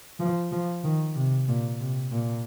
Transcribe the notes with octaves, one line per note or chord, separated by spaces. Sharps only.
F3
F3
D#3
C3
A#2
C3
A#2